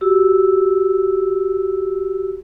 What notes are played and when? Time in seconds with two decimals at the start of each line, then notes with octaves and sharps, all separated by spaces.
0.01 F#4 G4 E6